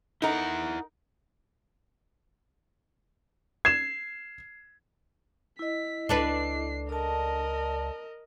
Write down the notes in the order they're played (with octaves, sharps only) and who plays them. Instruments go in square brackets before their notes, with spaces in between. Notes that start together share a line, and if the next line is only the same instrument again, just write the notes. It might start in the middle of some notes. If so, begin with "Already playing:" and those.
[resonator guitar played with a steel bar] D#4 A#4 [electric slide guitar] E4 F#5
[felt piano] G#6 E7 [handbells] C7
[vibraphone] E4 D#5 [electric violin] B6
[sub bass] C#2 [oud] D4 A4 B4 [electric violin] C7
[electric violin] A#4 D#5 [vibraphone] D5 A5